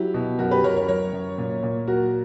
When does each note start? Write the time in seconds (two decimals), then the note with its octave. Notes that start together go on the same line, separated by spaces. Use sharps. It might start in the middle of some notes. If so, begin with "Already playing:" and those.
Already playing: F#3 E4 G4
0.14 B2
0.38 F#2 F#4 A#4
0.51 G4 B4
0.64 F#2 A#4 C#5
0.76 A#4 C#5
0.88 F#2 A#4 C#5
1.13 F#2
1.38 A#2
1.63 A#2
1.87 F#3 F#4 A#4